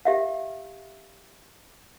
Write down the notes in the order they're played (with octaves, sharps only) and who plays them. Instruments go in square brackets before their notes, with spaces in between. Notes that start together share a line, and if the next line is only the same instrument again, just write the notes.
[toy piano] G4 E5 F5